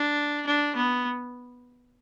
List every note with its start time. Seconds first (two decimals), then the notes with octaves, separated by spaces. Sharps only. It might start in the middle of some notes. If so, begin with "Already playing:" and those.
Already playing: D4
0.46 D4
0.76 B3